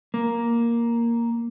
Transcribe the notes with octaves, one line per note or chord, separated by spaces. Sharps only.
A#3